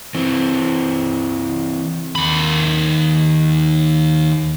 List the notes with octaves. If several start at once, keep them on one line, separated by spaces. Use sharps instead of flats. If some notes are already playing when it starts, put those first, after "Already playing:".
E3 C4
D#2 B5